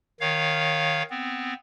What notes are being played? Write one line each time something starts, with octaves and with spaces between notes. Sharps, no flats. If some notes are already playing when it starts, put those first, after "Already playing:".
D#3 C#5 F5
B3 C4